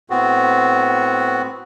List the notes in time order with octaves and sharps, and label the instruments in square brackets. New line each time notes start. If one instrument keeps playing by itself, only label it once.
[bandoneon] A2 B3 C4 F#4